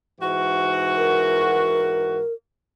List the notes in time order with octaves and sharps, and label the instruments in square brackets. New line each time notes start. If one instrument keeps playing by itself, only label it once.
[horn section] G#2 E3 F#4
[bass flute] A#4